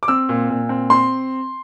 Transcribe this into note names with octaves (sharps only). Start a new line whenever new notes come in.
D6
C4 E6
A#2
A#2
C4
C4 C6